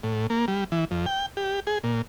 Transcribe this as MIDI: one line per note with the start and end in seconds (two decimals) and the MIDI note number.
0.03 0.27 45
0.30 0.46 58
0.48 0.64 55
0.72 0.85 52
0.91 1.06 41
1.06 1.26 79
1.37 1.60 67
1.67 1.78 68
1.84 2.02 46